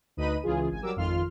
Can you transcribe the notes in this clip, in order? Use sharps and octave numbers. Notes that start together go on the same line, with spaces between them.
D2 D#4 B4 D#5 B5 D#7
C#2 C#3 E3 F4 G#4
G#1 G#5
F#3 G3 A#4 D6 E6
G#1 F2 D#3 F4 C6 F6